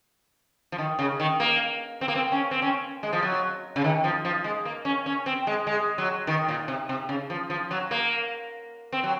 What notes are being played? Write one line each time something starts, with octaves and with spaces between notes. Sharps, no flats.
F3
D#3
C#3
D#3
A#3
C4
A#3
C4
C#4
C4
C#4
G#3
F3
F#3
C#3
D#3
F3
F3
G#3
A#3
C#4
C#4
C4
G#3
G#3
F#3
D#3
A#2
C3
C3
C#3
F3
F3
F#3
A#3
C4
F#3